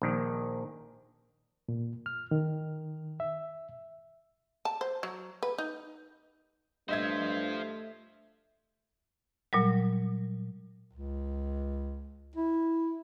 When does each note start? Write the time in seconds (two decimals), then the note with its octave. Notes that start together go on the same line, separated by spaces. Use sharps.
0.02 A#1 D#3
1.69 A#2
2.06 F6
2.31 D#3
3.20 E5
4.65 A5
4.81 C5
5.03 F#3
5.43 B4
5.58 D#4
6.89 G2 A3 F4 C5 D#5 E5 G#6
9.53 A#2 F#3 G3
10.92 C#2
12.36 E4